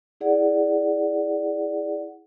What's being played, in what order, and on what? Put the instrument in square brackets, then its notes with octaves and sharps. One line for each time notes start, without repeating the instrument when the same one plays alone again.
[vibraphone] E4 G#4 D5 F#5